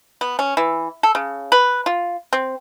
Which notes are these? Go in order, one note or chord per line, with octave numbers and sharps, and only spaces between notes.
B3
C#4
E3
A4
C#3
B4
F4
C4